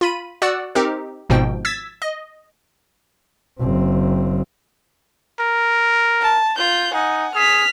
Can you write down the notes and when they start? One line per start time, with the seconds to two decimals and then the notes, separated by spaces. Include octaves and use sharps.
0.01 F4 B5 D#7
0.42 F#4 D5 F#5 E6 F#6
0.75 C4 D#4 G4 A#4
1.29 G#1 G#2 B2 F3 G5
1.65 E6 G#6 A6 B6
2.02 D#5
3.60 F#1 C4
5.40 A#4
6.21 A5
6.58 F4 G6
6.94 D#4 F#5 G#5
7.35 G#4 F6 B6